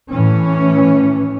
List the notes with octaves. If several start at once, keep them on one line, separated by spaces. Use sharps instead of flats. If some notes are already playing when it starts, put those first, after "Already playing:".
A2 E3 C#4